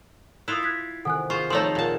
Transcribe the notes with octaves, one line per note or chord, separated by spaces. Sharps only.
E4 F4 D#6 F#6
F#6 G#6 B6
C3 D#3 A4 F#5 G#5 F#6
F4 G#4 C5 C#6 C7
F3 A3 D#4 A4 C#5 C6 C#7
D#2 A#2 F4 F#5 A5